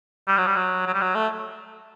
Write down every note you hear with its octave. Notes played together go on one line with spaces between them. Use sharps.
G3
F#3
G3
F#3
F#3
G3
F#3
A3